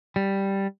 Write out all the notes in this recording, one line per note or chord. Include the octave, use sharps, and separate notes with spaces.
G3